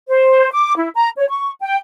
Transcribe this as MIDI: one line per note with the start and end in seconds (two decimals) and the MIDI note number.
0.09 0.49 72
0.52 0.75 86
0.76 0.88 64
0.95 1.09 82
1.17 1.26 73
1.29 1.51 85
1.60 1.76 79